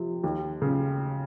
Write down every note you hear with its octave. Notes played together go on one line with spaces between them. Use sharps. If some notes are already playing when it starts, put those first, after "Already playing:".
Already playing: C3 F3
D#2
C#3